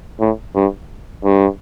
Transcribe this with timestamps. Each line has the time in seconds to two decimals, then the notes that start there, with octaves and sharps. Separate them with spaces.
0.20 A2
0.55 G2
1.25 G2